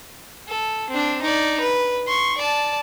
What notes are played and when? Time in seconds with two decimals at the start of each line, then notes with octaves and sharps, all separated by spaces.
0.48 A4
0.90 C4 D4
1.22 D#4 D5
1.61 B4
2.07 C6 C#6
2.37 D5 A5